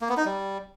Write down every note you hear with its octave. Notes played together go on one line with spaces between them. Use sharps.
A#3
B3
D#4
G3